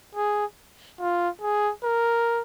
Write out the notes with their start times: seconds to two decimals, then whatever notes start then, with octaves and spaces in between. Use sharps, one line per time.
0.15 G#4
0.99 F4
1.41 G#4
1.84 A#4